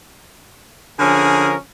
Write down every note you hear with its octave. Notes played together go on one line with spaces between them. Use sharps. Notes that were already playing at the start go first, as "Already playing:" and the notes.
D3 F3 C#4 G#4 A#4